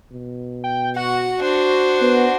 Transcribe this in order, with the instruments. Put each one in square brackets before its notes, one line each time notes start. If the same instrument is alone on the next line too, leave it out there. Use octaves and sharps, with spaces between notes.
[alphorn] B2
[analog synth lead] G5
[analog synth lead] F#4 [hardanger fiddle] F#5
[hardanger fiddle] D4 C5
[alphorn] B3